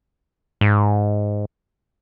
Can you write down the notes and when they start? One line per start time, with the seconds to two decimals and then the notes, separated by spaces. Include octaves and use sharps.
0.61 G#2